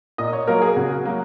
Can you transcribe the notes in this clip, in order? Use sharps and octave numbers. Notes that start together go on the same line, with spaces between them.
A#2 D#5
C#5
F#3 A#3 A#4
G#4
C#3 F#4
F#3 A#3